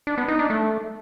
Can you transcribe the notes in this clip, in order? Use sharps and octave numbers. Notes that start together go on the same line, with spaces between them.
D4
B3
D#4
D4
A3